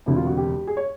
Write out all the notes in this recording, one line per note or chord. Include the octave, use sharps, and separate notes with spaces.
E1 D2 C3 E4
F4
F#4
G4
G#4
C#5